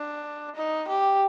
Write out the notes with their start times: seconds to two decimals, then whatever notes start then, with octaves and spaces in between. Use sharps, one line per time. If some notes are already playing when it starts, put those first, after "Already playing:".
Already playing: D4
0.56 D#4
0.88 G4